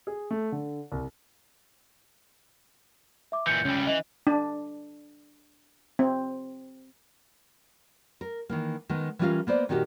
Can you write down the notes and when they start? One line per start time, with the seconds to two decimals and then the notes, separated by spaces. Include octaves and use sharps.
0.07 G#4
0.30 A3
0.52 D3
0.92 C2
3.32 E5 D6
3.47 A#2 E3 G6 C#7
3.65 C#2 G3 C#4
3.87 E3 D#5
4.27 D4
5.99 C4
8.21 A#4
8.49 D#3 E3 A#3
8.89 D#3 G#3 B3
9.19 E3 G3 C#4 F4 A#4 F5
9.47 A#3 B3 C5 D5
9.69 A#2 D#3 D#4 F#4 G4